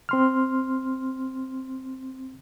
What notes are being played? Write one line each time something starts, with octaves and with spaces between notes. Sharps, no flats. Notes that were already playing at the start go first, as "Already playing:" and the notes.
C4 C6 F6